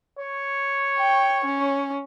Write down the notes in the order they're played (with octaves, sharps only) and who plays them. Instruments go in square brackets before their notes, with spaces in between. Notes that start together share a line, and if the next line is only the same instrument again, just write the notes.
[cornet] C#5
[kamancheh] G5
C#4